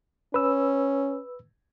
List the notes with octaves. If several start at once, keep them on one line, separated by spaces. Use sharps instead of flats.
C#4 B4 E6